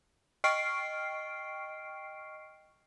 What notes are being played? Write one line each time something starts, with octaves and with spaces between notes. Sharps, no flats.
D#5 G5 C#6 F6 C7 D7